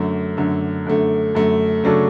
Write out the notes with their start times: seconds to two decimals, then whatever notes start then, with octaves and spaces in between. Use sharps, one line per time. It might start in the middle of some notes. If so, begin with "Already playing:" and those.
Already playing: F#2 D3 A3
0.37 F#2 D3 A3
0.86 F#2 D3 A3
1.35 F#2 D3 A3
1.84 C#3 F#3 A3 D4 A4